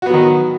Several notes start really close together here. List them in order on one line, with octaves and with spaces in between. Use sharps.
F#4 B3 F#3 D#3